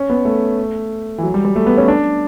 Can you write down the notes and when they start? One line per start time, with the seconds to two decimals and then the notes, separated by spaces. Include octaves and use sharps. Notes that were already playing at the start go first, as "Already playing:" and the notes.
Already playing: C#4
0.10 B3
0.25 A3
1.18 E3
1.23 F#3
1.34 G3
1.45 G3
1.56 A3
1.66 B3
1.78 C#4
1.88 D4